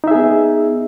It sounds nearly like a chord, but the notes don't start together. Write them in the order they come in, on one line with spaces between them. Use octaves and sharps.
D#4 E5 G#4 B3